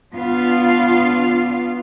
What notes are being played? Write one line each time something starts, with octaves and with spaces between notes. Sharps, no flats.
B3 D4 F4 F5